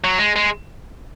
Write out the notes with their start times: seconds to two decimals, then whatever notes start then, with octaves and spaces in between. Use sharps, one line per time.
0.04 F#3
0.19 G#3
0.36 G#3